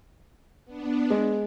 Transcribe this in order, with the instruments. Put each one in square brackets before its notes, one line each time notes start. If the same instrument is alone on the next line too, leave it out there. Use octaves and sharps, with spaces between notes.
[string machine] B3 D4
[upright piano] G#3